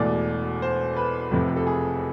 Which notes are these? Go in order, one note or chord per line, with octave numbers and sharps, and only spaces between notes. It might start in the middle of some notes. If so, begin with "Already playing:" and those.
Already playing: E1 E2 B2 A3 D5
C5
B4
F1 F2 C3 F3 B4
A4
G#4